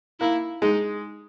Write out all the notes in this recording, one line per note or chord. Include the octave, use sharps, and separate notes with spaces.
A#3 E4
G#3 D#4